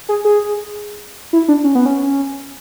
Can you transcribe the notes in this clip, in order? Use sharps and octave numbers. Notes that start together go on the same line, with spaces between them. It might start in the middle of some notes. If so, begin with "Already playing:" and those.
G#4
G#4
E4
D4
C#4
B3
C#4